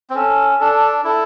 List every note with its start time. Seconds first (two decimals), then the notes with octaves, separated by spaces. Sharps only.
0.10 C4
0.16 C#4 A4
0.60 D4 A4
1.04 E4 A4